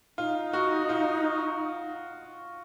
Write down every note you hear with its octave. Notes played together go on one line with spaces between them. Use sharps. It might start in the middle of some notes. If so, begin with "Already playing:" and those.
D#4 F4
F#4
F4